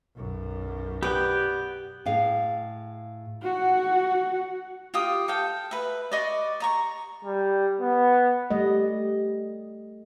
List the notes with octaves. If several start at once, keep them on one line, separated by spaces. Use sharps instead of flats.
B1 F#2
B3 G4 D5 G5
A2 G#4 F5
F#4 F#5
F4 G4 D#6
A4 F5 G5
B4 E5
D5 D#5 C#6
D5 A#5 C#6
G3
B3
G3 A3 D#5